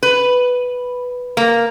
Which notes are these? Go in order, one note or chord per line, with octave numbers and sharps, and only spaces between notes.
B4
A#3